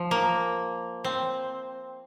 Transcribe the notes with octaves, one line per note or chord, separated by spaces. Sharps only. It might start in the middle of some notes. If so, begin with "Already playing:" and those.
Already playing: F3
A#3
C4